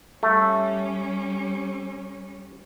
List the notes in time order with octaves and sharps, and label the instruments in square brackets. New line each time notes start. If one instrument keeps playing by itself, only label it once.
[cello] G3 C#4 [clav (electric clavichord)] A3